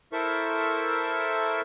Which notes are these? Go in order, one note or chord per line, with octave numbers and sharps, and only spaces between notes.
E4 A4 A#4 C5 E5 C#6